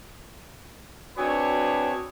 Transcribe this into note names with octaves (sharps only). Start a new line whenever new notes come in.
C4 D4 F#4 G#4 B4 C#5